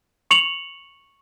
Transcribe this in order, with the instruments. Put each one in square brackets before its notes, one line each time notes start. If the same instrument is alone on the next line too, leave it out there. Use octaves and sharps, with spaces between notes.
[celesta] C#6 C#7 F7 F#7